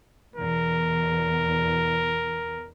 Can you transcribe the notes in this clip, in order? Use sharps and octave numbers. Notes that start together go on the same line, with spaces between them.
E2 B2 A#4